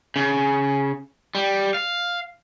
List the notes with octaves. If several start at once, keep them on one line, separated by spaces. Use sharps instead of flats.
C#3
G3
F5